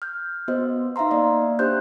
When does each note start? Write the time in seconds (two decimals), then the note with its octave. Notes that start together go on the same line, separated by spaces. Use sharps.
0.02 F6 G6
0.48 B3 F#4 C5 D#5
0.96 D#4 E5 F5 A#5 C6
1.11 A#3 D5 D#5 F5
1.59 D4 G4 C5 C6 F#6 G6